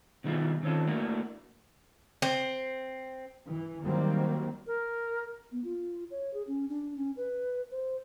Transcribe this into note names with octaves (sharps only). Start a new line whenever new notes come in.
B2 D#3 G3 E4 F4 G#4
D#3 C4 C#4 F4 A4
A3 A#3 D4 E4 F#4 A#4
C4
E3
D#3 F#3 G3 A#3 C4
A#4
B3
F4
C#5
G#4
C#4
D4
C#4
B4
C5